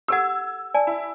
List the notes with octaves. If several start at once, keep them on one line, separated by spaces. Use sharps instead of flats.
G4 A4 F#5 E6 G#6
D5 G#5 A5
E4